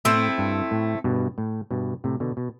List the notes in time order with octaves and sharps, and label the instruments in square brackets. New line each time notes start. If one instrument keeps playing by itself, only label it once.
[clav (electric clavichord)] A2 [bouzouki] A3 C4 E4
[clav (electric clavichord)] G2
A2
G2 B2
A2
G2 B2
A2 C3
B2 D3
B2